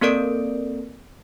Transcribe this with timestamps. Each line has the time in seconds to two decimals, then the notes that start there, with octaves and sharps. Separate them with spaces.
0.01 A#3 C4 A4 A#4 D5 D7